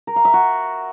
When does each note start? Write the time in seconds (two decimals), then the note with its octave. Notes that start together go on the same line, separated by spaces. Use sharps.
0.07 A#4
0.16 F5
0.25 E5
0.34 F#4